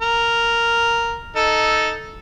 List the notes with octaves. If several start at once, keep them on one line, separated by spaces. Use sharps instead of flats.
A#4
D#4 A4